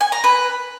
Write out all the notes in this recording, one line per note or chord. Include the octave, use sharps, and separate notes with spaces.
G#5
A#5
B4